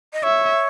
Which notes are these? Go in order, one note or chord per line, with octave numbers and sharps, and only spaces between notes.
D#5
C#5 E5